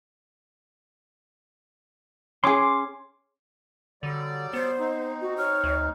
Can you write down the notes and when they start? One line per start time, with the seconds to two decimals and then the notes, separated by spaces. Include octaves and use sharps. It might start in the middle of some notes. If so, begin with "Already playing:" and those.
2.44 C#4 G#4 C6 D6
4.03 D3 F#3 G3 D5
4.53 B3 C5
4.79 C4 D#4
5.21 F#4
5.38 C#5 F6
5.64 D2